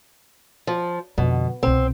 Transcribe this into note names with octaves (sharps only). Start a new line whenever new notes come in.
F3
F2 B2 D3
C2 B2 C4